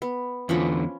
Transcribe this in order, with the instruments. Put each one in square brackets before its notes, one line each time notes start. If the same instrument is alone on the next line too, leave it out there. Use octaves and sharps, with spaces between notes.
[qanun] B3
[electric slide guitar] E2 D3 [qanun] F3 C#4 B5